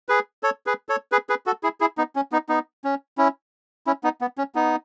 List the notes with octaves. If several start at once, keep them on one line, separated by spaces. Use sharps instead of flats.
G#4 B4
A4 C#5
G#4 B4
A4 C#5
G#4 B4
G#4 B4
F#4 A4
E4 G#4
E4 G#4
B3 D#4
C#4
B3 D#4
B3 D#4
C#4
C#4 E4
C#4 E4
B3 D#4
B3
C#4
B3 D#4